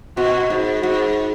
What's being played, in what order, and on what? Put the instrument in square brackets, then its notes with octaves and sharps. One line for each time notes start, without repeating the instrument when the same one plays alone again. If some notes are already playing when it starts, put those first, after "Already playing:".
[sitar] B2 [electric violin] F#4
[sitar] G#2
[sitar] G#2 [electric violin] F#4